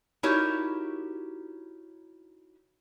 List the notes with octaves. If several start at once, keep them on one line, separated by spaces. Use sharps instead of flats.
D#4 E4 F#4 G4 A#4 C#5